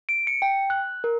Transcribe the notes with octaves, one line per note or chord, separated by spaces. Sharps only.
D7
C#7
G5
F#6
A#4